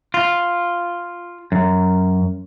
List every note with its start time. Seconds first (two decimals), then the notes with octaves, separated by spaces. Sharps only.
0.14 F4
1.52 F#2